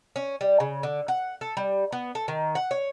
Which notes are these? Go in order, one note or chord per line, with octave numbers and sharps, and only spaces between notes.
C#4
G3
C#3
D3
F#5
A4
G3
B3
A4
D#3
F#5
C#5